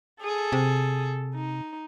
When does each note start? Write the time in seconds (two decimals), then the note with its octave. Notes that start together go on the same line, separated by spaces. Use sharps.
0.21 G#4 A4
0.52 C3
1.35 D#4